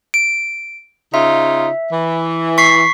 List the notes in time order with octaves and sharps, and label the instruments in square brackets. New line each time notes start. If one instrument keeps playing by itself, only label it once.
[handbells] D7
[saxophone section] C#3 D#4 F4 [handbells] E5
[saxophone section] E3
[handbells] C#6 B6 C7